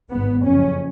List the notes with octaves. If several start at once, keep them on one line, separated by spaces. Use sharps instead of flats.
G#1 G#2 B3
F#1 F2 C#3 C#4